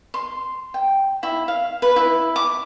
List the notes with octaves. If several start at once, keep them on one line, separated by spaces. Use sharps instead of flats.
C6
G5
E4
F5
B4
E4
D6